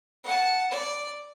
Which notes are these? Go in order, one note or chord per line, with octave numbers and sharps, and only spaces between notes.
F#5 A5
D5